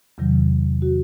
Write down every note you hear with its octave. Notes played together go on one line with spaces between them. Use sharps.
E2 C3 D#3 F#3
F#4